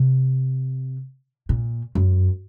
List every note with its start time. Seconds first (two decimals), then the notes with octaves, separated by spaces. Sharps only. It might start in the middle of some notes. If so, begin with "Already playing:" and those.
Already playing: C3
1.49 A#2
1.95 F#2